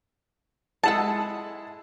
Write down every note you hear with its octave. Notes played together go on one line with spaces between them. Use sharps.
G#3 E4 G#4 A4 F#5 A5